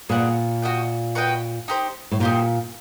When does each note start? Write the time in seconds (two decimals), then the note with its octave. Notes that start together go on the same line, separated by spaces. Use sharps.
0.09 A#2 G#4 B4 D5 F#5
0.62 F#4 B4 D#5 G5
1.15 F#4 B4 D#5 G5
1.68 D#4 G4 C5
2.11 A2
2.20 A#2 D#4 G4 C5